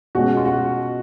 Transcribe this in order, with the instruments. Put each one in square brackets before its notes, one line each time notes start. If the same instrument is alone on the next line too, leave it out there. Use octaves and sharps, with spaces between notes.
[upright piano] B2 G#3 C#4 [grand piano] F#4
[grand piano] F4
F#4